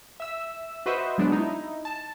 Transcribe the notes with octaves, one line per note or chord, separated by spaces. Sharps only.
E5 E6
F#4 B4 C5 D#5 E5
F#3 G#3 B3 D4
D#4 E4
A5